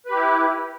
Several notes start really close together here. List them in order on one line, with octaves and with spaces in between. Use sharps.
B4 G4 E4